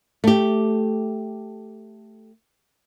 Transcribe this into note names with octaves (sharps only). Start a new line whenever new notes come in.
A3 G4